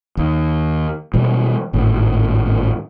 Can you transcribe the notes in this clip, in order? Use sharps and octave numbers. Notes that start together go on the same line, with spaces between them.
D#2
B2 E3 G3
G#1 E2 A2